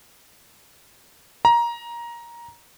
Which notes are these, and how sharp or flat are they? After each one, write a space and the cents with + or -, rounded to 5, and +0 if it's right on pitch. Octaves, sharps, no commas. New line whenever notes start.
A#5 +15